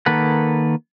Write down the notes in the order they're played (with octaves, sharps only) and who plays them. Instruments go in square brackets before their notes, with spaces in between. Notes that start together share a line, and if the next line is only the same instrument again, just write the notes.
[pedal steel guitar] D#3 A#3 A4 B4 F#5